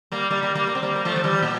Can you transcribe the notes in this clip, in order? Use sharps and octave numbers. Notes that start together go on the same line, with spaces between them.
G3 A#3
G3 A#3
G3 A#3
G3 A#3
A#3
C4
G3 A#3
A#3
F3 A3
F3
E3 G3
A#2